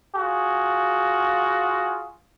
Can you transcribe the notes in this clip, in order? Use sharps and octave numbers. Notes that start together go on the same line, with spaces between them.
F4 F#4 G#4